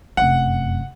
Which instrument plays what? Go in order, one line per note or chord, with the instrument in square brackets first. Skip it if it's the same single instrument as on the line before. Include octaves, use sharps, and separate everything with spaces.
[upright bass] F1 F#2 [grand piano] F#5